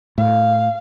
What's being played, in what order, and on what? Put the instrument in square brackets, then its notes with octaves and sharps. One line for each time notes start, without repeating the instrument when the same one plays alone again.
[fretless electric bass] A2 [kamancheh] F5